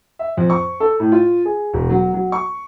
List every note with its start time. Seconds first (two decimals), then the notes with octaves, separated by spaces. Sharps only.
0.19 E5
0.37 F2
0.50 C#6
0.80 A4
1.00 A2
1.12 F4
1.45 G#4
1.73 E1
1.90 F#3
2.14 F#3
2.32 C#6